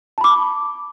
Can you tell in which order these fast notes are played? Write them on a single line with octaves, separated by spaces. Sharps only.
A5 B5 D6